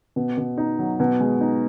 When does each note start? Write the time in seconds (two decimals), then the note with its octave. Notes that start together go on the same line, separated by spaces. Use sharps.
0.16 B2
0.38 B2
0.58 D#4
0.79 F#3
1.00 B2
1.20 G#3
1.41 D#4